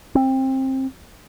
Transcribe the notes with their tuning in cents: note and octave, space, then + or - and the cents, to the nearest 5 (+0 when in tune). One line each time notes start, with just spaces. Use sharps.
C4 +20